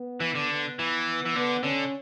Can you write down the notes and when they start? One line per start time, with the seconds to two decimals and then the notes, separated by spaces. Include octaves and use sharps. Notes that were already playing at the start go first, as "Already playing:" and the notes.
Already playing: B3
0.21 E3
0.36 D3
0.50 B3
0.79 E3
1.26 E3
1.36 D3 B3
1.64 D3 C#4